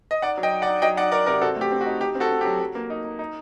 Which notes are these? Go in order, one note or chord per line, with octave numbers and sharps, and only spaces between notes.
D#5
D#4 D5 F#5
F#3
D#5 G5
D#4
D5 F#5
D#4
F#3 D#5 G5
D#4 D5 F#5
D#4 A#4 D5
C3 A#4 D5
C4 F#4 A4
A3 G4
C4
F#4
D#4
D#4 G4
C4
F#4 A4
C4
G4
F#3
F#3
A#3
D#4
D#4
D#4